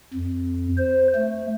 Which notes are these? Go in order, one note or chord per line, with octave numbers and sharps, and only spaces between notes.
F2
C5
A3